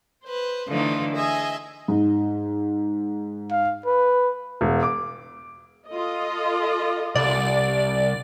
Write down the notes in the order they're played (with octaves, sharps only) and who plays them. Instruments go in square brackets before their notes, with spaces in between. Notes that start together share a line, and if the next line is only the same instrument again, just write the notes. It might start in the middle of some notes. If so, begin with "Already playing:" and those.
[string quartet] B4 C5
D3 E3 F3 A3 D#4 F4
G#4 D#5 E5 G#5
[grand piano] G#2
[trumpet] F5
B4
[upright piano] E1
D6
[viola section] F4 A4 D#5
[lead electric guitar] C2 [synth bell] D5